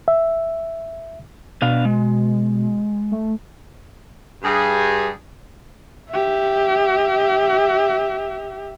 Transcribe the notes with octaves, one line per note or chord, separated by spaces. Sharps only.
E5
B2 B3 D4 F5
G#3
A3
G2 G#4
G4 E5